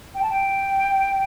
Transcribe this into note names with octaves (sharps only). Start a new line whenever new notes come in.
G5
A5
G5